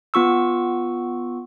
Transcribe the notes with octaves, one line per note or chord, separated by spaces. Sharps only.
B3 F4 C#6 E6